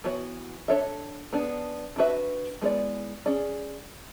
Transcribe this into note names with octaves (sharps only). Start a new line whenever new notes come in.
E3 B3 F#4 C#5
D4 A4 C#5 E5
B3 D4 G#4
D4 F#4 B4 E5
G#3 B3 E4 G#4 D5
C#4 G#4 D5